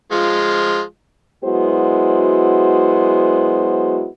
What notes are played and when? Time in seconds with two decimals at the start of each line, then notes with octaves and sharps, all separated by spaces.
0.12 F3 G#3 F4
1.44 F#3 G#3 B3 E4 F#4 C5